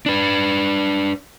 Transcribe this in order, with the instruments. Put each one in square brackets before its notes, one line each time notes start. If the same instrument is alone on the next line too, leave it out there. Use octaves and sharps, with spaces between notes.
[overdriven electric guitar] D4 B4